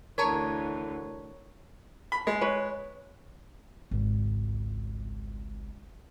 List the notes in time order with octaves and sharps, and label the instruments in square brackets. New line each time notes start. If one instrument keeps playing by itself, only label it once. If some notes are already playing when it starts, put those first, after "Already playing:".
[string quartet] D2 D3 E3 [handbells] A#4 A5 A#5 [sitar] C#5
[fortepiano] B5
G#3
[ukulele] B4 C#5
[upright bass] G#1 C#2